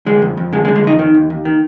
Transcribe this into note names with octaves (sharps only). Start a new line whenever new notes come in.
D3 G#3
F2
F2
D3 G#3
G#3
D3
G#3
F2 D#4
D#3
D#2
D#2
D#3